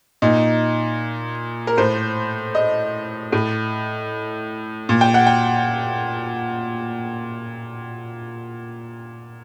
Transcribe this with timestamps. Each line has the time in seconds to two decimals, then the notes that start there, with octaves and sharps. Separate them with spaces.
0.22 A#2 D#4
1.67 A#4
1.78 A2 C5
2.55 D#5
3.32 A2
4.89 A#2
5.01 G5
5.14 F#5
5.27 G5